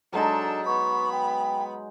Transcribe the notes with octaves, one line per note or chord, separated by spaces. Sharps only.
F#3 G#3 D4 D#4 A4
B3 B5 C#6
G5